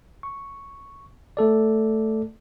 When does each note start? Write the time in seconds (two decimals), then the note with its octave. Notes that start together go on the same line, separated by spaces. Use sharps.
0.23 C#6
1.37 A3 A4 D5